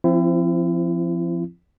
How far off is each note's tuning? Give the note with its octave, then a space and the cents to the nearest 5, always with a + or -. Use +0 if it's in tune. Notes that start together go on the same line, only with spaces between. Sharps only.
F3 -15 C4 +0 E4 +35